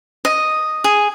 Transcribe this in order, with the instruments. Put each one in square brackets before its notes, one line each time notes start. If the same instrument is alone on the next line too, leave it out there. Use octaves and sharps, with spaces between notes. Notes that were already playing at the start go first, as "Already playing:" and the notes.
[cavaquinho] D#5
G#4